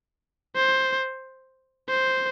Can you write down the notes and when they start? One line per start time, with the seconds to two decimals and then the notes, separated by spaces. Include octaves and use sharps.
0.55 C5
1.89 C5